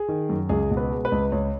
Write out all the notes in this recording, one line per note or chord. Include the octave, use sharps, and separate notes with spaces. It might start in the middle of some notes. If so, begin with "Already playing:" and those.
Already playing: G#4
D#3
F#2
C#2 G#4
B2
B4
G#3
B4
C#2
C#2 C#5